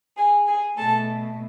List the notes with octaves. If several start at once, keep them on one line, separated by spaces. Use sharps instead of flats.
G#4 G#5
G#4 G#5
B2 A3 A4 A5